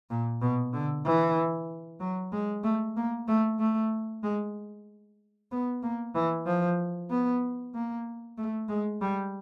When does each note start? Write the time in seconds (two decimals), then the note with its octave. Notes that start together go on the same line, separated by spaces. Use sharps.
0.10 A#2
0.41 B2
0.73 D3
1.05 E3
2.00 F#3
2.32 G#3
2.64 A3
2.96 A#3
3.28 A3
3.59 A3
4.23 G#3
5.51 B3
5.83 A#3
6.15 E3
6.46 F3
7.10 B3
7.74 A#3
8.38 A3
8.69 G#3
9.01 G3